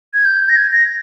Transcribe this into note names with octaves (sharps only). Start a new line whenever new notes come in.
G#6
G6
A#6
G#6
A#6